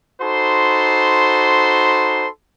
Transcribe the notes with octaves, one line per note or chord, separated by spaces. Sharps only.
D#4 F#4 A4 C5 B5 C6